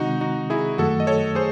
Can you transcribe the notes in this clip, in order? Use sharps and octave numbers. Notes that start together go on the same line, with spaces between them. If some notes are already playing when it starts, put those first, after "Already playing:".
Already playing: C3 D#3 G#3 C4 D#4 F#4
D#4 F#4
E4 G#4
F#2 D#3 F#3 A3 F#4 A4
D#5
A4 C#5
G#4 C5